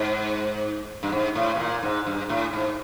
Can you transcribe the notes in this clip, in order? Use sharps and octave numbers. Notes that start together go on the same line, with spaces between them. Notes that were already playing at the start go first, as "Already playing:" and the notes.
Already playing: G#2
G2
G#2
A2
B2
A#2
G#2
G2
A2
G#2